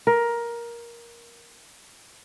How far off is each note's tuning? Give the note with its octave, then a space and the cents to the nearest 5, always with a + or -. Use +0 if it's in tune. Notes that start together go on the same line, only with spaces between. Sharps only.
A#4 +15